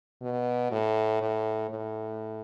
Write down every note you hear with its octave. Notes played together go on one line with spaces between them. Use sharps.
B2
A2
A2
A2